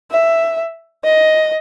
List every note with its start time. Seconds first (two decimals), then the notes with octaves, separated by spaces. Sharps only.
0.11 E5
1.04 D#5